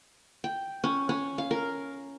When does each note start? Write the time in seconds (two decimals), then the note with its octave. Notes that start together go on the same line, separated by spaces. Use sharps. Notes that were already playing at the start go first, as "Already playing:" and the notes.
0.44 G5
0.84 C#4
1.09 C#4
1.38 F5
1.51 A#4